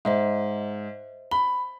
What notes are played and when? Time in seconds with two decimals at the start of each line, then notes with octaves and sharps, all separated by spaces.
0.05 G#2 C5 D#5 E5
1.31 B5 G7